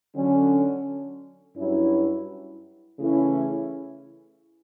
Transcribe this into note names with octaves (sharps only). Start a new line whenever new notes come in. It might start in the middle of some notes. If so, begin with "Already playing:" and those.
D3 F#3 C#4
G2 F#3 C#4 E4
C#3 E3 A3 C#4 E4